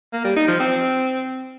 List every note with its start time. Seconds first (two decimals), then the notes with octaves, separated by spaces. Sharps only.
0.13 A#3
0.24 G3
0.36 D#4
0.48 F3
0.59 C4